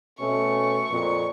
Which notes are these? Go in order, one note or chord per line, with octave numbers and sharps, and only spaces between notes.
B2 A3 C#4 C#6
F2 A#2